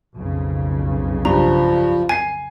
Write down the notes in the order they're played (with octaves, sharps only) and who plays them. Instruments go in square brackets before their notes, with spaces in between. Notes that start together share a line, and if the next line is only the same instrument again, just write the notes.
[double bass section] B1 F2 C#3
[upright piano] G2 [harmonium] F3 [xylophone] A#5
[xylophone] G#5 [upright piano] G#6 C7